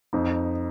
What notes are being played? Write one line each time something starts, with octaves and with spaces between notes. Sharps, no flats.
F2 D#4